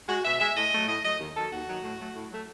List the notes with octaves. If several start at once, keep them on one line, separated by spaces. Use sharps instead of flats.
G#3 F#4
B2 E5
G#3 E5
A2 D#5
F#3 A3
A2 D#5
F#3 A3 D#5
D#2
D#3 F#3 A4
D#2 F#4
D#3 F#3
A2
F#3 A3
A2
F#3 A3